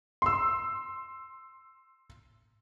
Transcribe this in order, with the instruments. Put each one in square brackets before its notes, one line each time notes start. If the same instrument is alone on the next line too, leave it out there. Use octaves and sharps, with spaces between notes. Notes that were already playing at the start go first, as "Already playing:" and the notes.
[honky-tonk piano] C6 E6